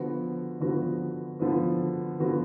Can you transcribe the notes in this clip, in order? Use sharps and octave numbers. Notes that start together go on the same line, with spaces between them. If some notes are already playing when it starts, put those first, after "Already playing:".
Already playing: D3 F3 B3 F#4
D3 F3 B3 F#4
D3 F3 B3 F#4
D3 F3 B3 F#4